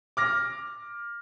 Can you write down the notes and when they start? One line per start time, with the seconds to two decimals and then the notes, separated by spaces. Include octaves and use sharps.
0.17 D6 F6 A#6